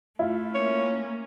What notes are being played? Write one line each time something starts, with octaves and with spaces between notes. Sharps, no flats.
A3 E4 F4
A#3 C#4 C#5